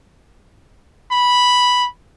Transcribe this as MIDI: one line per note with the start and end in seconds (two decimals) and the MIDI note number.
1.12 1.86 83